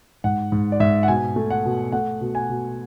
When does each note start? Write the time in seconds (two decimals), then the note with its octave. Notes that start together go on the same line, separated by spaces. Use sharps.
0.24 G#2 F#5
0.52 G#2
0.72 D5
0.80 G#2 E5
1.03 F#5
1.08 B2 G#5
1.36 A3
1.50 F#5
1.65 B2
1.92 A3 F#5
2.21 B2
2.35 G#5
2.49 B2